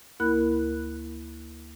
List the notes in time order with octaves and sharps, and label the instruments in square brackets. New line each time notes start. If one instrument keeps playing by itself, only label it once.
[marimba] D2 A#3 E4 A#4 B5 F#6